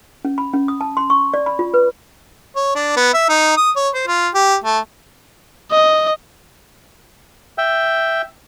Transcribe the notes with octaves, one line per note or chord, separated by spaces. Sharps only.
C#4
B5
C#4
D#6
A5
C6
C#6
D5
B5
F4
B4
C#5
D4
B3
E5
D#4
D#6
C#5
C5
F4
G4
A3
D#5
E5 G5